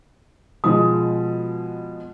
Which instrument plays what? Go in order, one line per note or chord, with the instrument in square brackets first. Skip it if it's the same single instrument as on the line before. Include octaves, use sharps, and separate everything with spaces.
[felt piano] B2 F3 G#3 [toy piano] D#6